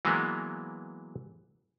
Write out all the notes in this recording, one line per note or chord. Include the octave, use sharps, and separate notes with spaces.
E3 F#3 G#3 A#3 B3